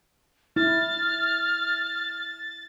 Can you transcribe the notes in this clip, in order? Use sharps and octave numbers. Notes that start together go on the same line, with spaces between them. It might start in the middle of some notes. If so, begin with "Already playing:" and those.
E4 F6 A6